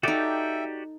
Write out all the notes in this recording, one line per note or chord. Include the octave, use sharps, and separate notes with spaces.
D#4 F#4 G4 A4 D5 E5 G5